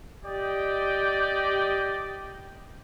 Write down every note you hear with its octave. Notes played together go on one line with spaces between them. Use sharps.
G4 D5 D#5 G5